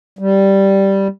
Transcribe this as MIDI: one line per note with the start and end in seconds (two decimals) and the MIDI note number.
0.19 1.08 55